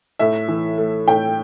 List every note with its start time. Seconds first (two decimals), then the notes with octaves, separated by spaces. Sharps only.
0.19 A2 E5
0.48 E3
0.78 A3
1.08 A2 G5